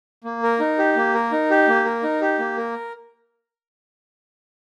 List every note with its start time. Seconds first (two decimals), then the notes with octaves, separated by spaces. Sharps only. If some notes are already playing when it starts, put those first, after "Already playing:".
0.24 A#3
0.43 A#4
0.60 D#4
0.78 G4
0.96 A#3
1.14 A#4
1.32 D#4
1.50 G4
1.68 A#3
1.85 A#4
2.03 D#4
2.21 G4
2.39 A#3
2.57 A#4